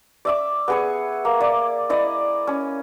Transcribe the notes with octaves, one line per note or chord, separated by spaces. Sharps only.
D5 E5 D6
B3 G#4 C#6
A#3
D5
E4 D5 D#5
C#4